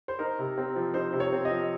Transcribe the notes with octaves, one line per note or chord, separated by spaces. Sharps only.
C5
D#4 A#4
C3
C4
F3
D#4 C5
C3
C#5
C4
D#5
F3